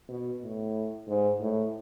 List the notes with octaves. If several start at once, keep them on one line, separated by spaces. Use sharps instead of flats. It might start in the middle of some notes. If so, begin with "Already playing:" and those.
B2
A2
G#2
A2